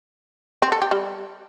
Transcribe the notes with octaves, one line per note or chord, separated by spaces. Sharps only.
C4
A4
G4
G3